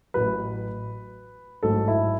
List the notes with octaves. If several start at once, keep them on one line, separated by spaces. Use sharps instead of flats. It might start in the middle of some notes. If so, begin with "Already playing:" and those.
A1 A2 F#3 B4
A1 G#2 F#3 A4
E4